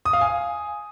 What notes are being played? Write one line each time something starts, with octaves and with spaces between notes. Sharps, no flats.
D#6
F5
G#5